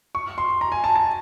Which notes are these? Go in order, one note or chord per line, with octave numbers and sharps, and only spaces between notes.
C#6
C6
A#5
G#5
A5
A5